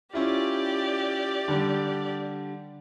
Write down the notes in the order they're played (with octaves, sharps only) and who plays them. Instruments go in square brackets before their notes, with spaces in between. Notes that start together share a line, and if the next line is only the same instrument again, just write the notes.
[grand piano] C#4 E4 F4 [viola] G4 D5
[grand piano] D3 G3